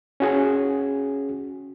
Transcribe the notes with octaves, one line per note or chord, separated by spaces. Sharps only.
C#4 F#4 G#4